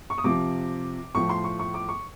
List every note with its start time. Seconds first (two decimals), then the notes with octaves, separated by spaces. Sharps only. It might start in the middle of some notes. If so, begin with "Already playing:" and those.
0.10 C#6
0.18 D#6
0.24 C3 F3 D6
1.14 A2 F3 C#6
1.29 C6
1.44 C#6
1.59 C#6
1.74 D6
1.89 C#6